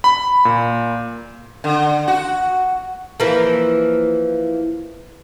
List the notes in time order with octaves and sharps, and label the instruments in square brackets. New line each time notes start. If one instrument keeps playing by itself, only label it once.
[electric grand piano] B5
A#2
[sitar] D3
F#4
[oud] E3 F3 A#3